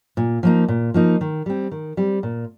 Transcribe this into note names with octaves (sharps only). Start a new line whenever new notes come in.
A#2
F3 A#3 D#4
A#2
F3 A#3 D#4
D#3
G3 C4
D#3
G3 C4
A#2